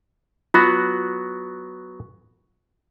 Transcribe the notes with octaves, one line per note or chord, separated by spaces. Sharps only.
F#3 B3 F4 F#4